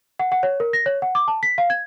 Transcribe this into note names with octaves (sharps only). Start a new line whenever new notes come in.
F#5
F#5
C#5
A#4
A#6
C#5
F#5
D6
A5
B6
F5
G#6